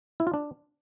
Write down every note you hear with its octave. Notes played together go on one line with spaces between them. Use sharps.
E4
F4
D4